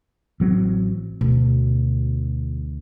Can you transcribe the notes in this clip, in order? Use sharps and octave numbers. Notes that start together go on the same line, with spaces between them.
A1 F#3 C4
D2 B2